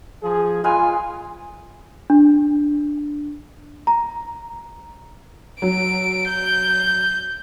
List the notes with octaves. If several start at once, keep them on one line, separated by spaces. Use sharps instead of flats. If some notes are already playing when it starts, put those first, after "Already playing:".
F3 G#4
G#3 F4 B4 F5 G#5
D4
A#5
F#3 D7
G6